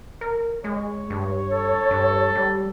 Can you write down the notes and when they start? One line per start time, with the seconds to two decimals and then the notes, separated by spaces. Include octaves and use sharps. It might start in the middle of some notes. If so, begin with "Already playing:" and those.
0.21 A#4
0.64 G#3 C#5
1.10 G2
1.52 A4
1.91 G2
2.35 G3